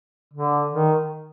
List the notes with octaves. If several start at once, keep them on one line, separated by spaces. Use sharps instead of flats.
D3
D#3